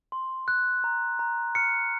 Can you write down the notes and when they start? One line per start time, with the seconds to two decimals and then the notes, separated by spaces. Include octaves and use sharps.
0.12 C6
0.48 F#6
0.84 A#5
1.19 A#5
1.55 F6 C#7